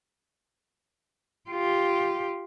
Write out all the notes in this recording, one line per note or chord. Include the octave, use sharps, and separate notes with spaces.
F4 G4